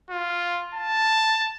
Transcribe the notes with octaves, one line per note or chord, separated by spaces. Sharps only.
F4
A5